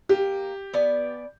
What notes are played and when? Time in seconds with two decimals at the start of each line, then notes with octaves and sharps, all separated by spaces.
0.09 A#3 G4
0.73 B3 D5 G#5